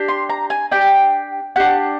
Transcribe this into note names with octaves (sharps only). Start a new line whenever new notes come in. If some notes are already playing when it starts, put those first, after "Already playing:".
Already playing: D4 G4
C6
A#5
G#5
D4 G4 G5
D4 G4 F#5